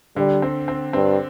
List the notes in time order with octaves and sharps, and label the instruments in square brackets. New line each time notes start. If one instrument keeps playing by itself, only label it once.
[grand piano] D3 [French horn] G3
[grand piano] C4
C4
[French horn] G2 [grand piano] C4